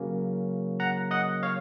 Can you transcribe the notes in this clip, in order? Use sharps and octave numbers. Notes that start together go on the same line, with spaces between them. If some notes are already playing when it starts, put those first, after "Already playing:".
Already playing: C#3 F#3 A#3 C#4
F#5 A#5
D#5 F#5
C#5 F5